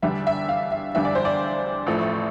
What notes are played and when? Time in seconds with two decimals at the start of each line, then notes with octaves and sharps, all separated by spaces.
0.02 E2 D3 G3 D4 E5
0.27 E5
0.49 F5
0.72 E5
0.95 E2 D3 G3 D4 E5
1.05 D5
1.15 C5
1.25 D5
1.86 A1 A2 F3 A3